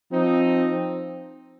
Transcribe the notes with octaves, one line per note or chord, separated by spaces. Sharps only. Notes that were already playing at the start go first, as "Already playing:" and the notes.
F3 C4 D#4